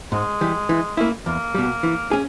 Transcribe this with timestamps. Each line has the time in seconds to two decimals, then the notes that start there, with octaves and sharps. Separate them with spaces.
0.12 G#2 G#3
0.41 E3 G3
0.69 E3
0.97 A#3 C#4 E4
1.26 E2 A#3
1.55 B2 G3
1.83 E3
2.11 C#4 G#4